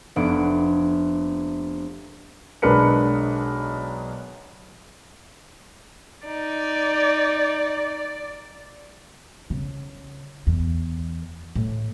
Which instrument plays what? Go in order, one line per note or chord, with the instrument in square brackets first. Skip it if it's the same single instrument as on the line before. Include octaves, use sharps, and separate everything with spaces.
[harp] F1 B3 D4 D7
[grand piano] B1 G#3 D4 A#4 B4 C#7
[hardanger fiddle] D#4 [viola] D5
[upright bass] C#3
E2
A2